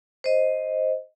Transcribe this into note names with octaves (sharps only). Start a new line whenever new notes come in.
C5 D#5